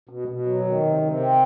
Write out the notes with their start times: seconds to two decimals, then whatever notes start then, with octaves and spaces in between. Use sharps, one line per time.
0.09 B2
0.28 B2
0.46 F#3
0.65 D#3
0.83 C3
1.01 C3
1.20 C4